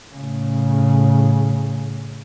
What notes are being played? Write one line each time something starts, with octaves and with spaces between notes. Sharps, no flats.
A2 C#3